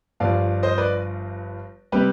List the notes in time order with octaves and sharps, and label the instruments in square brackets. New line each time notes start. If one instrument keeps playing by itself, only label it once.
[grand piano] G1 G2 F3 D5 F5
C5 D#5
B4 D5
C3 G3 G4 B4